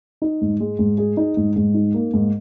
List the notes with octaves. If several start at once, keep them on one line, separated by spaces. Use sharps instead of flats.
D#4
G#2
G#3
G#2
G#4
D#4
G#2
G#2
D#4
A#3
G#2